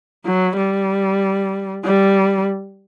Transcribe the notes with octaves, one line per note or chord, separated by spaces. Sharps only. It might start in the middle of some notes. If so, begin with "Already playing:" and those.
F#3
G3
G3